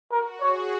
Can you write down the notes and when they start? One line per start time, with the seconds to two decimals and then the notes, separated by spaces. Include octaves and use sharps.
0.12 F#4 A#4
0.41 G#4 C#5